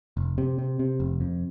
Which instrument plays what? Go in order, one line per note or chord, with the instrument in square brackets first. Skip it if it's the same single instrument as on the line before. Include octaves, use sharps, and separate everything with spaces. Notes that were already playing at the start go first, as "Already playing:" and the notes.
[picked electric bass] F1
C3
C3
C3
F1
F2